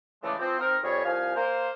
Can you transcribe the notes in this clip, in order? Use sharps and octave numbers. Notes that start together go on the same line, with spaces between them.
C#3 E3 G#3 A3 D5 D6
F3 C4
C4 D#4 A#4
F2 G3 G#4 C#5
C2 F3 F5 G#5
A#3 C5